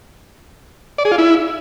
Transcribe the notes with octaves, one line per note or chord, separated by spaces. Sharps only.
D5
G#4
F4
E4